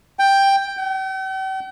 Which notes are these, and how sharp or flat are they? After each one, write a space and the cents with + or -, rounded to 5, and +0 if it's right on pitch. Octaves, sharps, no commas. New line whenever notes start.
G5 +10
G5 -45